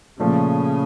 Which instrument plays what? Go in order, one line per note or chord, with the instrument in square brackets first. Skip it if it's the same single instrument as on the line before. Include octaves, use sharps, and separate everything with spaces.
[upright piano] A#2 F3 A3 [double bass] C#3